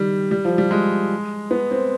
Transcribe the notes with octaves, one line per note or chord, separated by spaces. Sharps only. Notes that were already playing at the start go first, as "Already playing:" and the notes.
Already playing: D#3 G3
G3
F3
G3
G#3
B3
C4